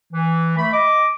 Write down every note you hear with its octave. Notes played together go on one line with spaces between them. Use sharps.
E3
A3 B5
D#5 D6